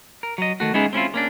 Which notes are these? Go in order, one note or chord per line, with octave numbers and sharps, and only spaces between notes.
A#4
F#3 D#5
D#3 A3 F#4
G#3 B3 C#4 D#4 E4 G#4
C4 C#4 E4 F4
A#3 C#4 D4